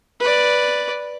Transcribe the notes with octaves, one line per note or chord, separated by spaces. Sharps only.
B4 D5